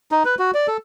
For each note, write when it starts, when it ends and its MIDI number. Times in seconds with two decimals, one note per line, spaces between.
0.12 0.23 63
0.25 0.35 71
0.39 0.51 66
0.54 0.67 74
0.67 0.77 69